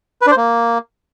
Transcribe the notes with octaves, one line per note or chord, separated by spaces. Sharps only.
B4
D4
C5
A#3